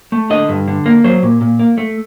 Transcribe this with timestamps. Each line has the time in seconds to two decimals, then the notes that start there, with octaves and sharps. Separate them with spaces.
0.12 A3
0.30 D3 D#5
0.49 G2
0.68 D3
0.86 A#3
1.04 F#3 C5
1.23 A#2
1.41 A#2
1.59 A#3
1.78 A3